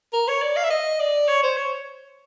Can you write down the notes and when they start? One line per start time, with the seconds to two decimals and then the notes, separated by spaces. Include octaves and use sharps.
0.13 A#4
0.28 C#5
0.42 D5
0.57 F5
0.64 E5
0.70 D#5
0.99 D5
1.28 C#5
1.43 C5
1.57 C#5